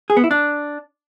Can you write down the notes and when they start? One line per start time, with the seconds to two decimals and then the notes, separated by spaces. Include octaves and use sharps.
0.10 G#4
0.17 B3
0.24 E4
0.31 D4